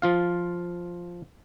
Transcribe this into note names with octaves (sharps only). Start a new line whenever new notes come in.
F3 F4 F5